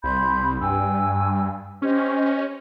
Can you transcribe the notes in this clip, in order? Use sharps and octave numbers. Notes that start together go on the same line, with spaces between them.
C2 B5 C6 G6
G2 G5 G#5 E6
C#4 G4 C5 D#5